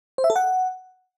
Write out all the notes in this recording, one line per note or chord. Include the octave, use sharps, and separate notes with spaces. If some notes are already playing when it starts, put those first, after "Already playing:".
C5
E5
A4
F#5